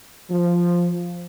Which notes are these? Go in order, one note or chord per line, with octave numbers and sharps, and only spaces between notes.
F3